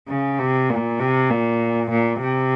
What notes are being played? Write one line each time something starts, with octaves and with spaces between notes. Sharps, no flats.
C#3
C3
A#2
C3
A#2
A#2
C3